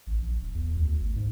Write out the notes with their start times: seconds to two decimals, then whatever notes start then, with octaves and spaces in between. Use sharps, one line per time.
0.07 A1
0.21 A#1
0.41 D1
0.55 E2
0.76 D2
1.00 G1
1.16 G#2